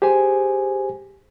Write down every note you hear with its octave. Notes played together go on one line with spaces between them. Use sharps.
G4 G#4 C5 G#5